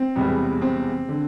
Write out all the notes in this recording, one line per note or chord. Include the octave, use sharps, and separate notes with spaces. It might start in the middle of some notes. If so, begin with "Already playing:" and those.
Already playing: C4
E1 E2 C3 G3 B3
C4
D3